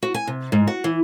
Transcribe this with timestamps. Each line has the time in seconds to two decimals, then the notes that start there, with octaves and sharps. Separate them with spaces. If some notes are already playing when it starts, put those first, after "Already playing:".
0.03 F#4
0.14 G#5
0.27 C3
0.52 G#2
0.67 F#4
0.84 E3